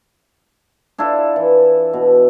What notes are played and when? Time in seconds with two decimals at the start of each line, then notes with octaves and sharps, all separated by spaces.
0.98 D4 E4 F4 A4
1.36 E3
1.93 B2